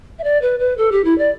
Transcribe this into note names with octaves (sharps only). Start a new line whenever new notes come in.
E5
D5
B4
B4
A4
G4
E4
D5